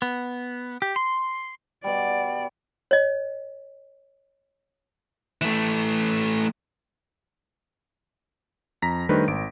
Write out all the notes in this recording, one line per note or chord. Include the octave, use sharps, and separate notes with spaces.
B3
G4
C6
B2 G3 D5
C#5 D#5
E3 A3
F2 A#5 A#6 B6
D#3 G3 A3 D4 B4 C5
G#1 D7